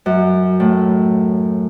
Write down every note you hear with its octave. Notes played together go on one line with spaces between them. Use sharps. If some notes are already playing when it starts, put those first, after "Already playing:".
F#2
A2